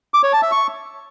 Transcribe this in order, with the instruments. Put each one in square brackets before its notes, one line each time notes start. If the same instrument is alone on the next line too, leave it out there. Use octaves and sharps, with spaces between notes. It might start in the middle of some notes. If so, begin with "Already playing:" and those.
[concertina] D6
C#5
A5
E5
C#6